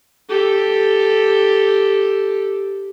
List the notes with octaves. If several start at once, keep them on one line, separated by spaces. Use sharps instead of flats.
G4 A4